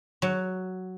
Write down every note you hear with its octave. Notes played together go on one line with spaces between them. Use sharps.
F#3